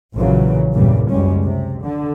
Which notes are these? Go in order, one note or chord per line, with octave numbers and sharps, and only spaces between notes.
A#1 A#2 C#3 E3 F#3
E2 G2 A#2 C#3 E3 G3
F#1 C#2 F#2 G3 G#3 C#4
C3
D3